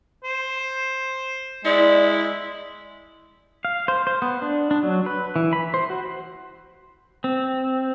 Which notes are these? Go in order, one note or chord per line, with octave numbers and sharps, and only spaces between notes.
C5
G#3 E4 D5
F5
C5
C5
B3
D4
D4
F#3
B4
E3
B5
C5
F#4
C4